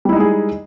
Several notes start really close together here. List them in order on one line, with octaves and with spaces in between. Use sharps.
G3 E4 D#4 G#3 G#4